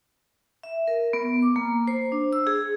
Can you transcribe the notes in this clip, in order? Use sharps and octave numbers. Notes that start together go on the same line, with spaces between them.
E5
A#4
B3
D6
A#3
C5
D4
E6
G#4